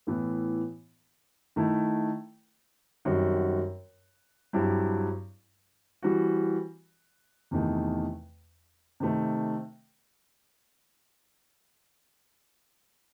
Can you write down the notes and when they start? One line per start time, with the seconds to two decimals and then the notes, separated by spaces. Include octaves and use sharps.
0.07 A2 E3 B3
1.56 D#3 A3 E4
3.05 F#2 D#3 G3 C4 F#4
4.53 G2 F#3 C4 E4 G4
6.03 E3 G3 C4 F#4
7.51 E2 C3 D#3 A3
9.00 C3 D#3 A3 C4